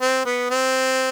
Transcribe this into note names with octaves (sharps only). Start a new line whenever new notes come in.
C4
B3
C4